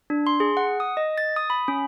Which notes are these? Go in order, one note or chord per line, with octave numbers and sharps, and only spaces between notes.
D4
C6
G#4
F#5
D#6
D#5
A6
D#6
B5
C#4